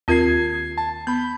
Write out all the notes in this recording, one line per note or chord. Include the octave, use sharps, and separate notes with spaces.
D#2 C4 F4 A#4 G#6 C7
A5
B3 B5 G6